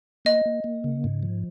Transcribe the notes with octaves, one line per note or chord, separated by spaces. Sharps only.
A#3 D#5
A#3
A#3
C#3
G#2
F3